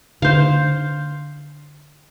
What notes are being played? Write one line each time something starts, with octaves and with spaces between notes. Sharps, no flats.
D3 C5 F5